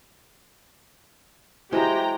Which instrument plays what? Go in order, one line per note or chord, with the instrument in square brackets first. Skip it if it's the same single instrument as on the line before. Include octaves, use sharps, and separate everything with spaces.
[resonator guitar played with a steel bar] G#3 [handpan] E4 F#4 C5 [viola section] G4 G5 A#5